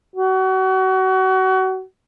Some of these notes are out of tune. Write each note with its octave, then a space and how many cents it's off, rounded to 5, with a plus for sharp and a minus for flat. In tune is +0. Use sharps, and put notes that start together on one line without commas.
F#4 +30